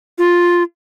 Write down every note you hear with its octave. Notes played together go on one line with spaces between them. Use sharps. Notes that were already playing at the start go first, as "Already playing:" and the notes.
F4